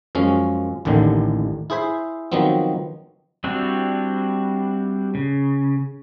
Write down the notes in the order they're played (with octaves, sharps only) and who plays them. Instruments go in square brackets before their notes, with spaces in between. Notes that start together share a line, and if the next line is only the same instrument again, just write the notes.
[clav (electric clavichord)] F#2 F3 G#3 C#4
A1 D#2 A2 D3 D#3
E4 G#4 C5 E5
D#3 F3 F#3 B3 C4
[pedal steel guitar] G3 C4 D4 E4 F#4
C#3